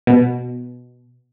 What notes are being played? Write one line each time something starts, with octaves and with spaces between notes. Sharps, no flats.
B2